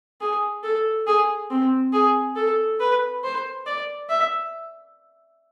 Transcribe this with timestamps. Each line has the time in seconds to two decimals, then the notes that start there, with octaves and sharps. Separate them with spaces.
0.21 G#4
0.64 A4
1.07 G#4
1.50 C4
1.93 G#4
2.36 A4
2.80 B4
3.24 C5
3.66 D5
4.09 E5